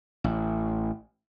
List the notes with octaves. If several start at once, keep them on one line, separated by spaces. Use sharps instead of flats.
A1